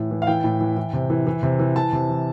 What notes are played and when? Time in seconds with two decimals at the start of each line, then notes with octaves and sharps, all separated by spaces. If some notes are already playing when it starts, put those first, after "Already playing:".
Already playing: A2 E3
0.11 E3
0.22 F5
0.27 E3 G5
0.44 A2
0.61 E3
0.77 E3
0.93 C3
1.10 E3
1.27 E3
1.43 C3
1.59 E3
1.76 E3 A5
1.93 C3
2.09 E3